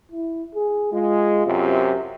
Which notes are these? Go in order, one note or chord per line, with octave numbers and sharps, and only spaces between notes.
E4
G#4
G#3 F4
F#2 C3